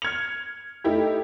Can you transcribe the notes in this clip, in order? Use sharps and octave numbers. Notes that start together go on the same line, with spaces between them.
F6 G#6 C#7 F7
A3 D#4 E4 G4